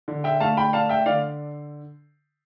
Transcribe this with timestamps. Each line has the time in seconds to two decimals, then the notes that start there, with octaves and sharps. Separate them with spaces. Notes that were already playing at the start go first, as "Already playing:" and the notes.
0.08 D3
0.24 E5 G5
0.40 A3 F5 A5
0.57 G5 B5
0.73 D4 F5 A5
0.89 E5 G5
1.06 D3 D5 F5